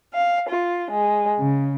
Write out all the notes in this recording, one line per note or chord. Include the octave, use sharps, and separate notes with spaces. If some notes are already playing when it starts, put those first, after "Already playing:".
F5
F4
G#3
C#3